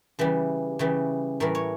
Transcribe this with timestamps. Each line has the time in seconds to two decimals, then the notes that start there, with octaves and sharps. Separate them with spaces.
0.19 C#3 E3 G3
0.79 C#3 E3 G3
1.40 A2 E3 G3 A#4
1.55 C#5